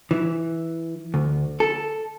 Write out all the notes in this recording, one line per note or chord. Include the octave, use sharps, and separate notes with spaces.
E3
D2
A4